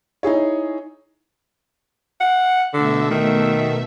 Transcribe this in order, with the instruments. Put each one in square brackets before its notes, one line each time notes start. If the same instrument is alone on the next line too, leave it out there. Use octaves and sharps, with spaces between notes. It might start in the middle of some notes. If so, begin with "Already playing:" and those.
[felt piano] D#4 E4 G#4 C#5
[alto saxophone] F#5
[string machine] B2 A3 E5 [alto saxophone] D3
[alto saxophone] D#3